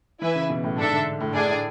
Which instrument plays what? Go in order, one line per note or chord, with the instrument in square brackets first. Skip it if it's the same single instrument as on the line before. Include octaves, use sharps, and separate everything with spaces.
[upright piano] E3 [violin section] E4 B4 E5 G#5
[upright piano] C#3
B2
A2
[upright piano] G#2 [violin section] D4 A4 E5
[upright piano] D3
A2
[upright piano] A2 [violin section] D4 G#4 D5 G#5
[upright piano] A2